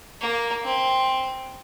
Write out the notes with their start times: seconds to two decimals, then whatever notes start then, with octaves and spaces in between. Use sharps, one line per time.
0.21 A#3
0.64 C4